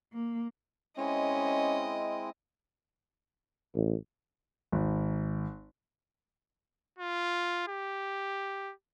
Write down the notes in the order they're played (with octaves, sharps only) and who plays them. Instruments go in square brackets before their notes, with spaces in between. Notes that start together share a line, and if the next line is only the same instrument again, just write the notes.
[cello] A#3
[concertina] G#3 C4 E4 [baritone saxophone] C#4 [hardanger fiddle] D#5
[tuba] A1
[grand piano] G#1
[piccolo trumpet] F4
G4